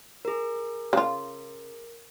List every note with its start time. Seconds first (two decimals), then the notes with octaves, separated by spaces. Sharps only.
0.25 G#4 A#4
0.93 C#3 F4